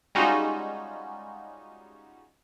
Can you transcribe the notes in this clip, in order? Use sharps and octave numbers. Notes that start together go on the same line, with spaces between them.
G3 G#3 C#4 D#4 F4 F#4